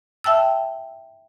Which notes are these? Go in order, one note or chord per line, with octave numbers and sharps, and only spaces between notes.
E5 G5 A5 E6